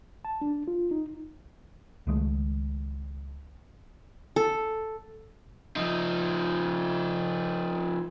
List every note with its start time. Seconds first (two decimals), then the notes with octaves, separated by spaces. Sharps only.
0.25 A5
0.41 D4
0.68 F4
0.91 D#4
2.07 C#2 D#3 G#3 A3
4.36 A4
5.76 F3 D#4